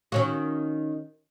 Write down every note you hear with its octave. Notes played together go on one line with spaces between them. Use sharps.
D#3 C#4 F#4